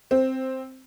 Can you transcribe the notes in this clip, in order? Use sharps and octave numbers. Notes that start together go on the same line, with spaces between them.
C4